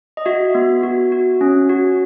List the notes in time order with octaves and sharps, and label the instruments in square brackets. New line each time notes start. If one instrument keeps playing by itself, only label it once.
[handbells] D#5
F#4 E5
B3
F#4
F#4
C#4
F#4